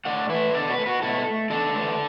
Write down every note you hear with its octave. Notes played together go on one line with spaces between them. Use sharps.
A2 D5 F#5
E3 A3 B4 E5
B2 A4 D5
F#4 B4
A3
F#4 B4
B2 E4 A4
A3
E2 A4 D5
E3 A3